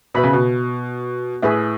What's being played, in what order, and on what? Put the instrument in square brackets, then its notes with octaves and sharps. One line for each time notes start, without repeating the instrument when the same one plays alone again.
[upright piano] B2 [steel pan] B4 E5 B5
[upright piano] C#3
B2
[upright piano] A2 [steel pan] G#4 B4 E5